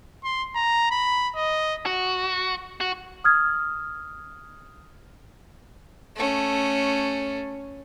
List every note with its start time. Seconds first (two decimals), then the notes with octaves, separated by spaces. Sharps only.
0.24 C6
0.55 A#5
0.91 B5
1.36 D#5
1.86 F#4
2.81 F#4
3.24 D#6 F6 G#6
6.16 A3 C#4